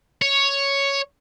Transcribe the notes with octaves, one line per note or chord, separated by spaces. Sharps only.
C#5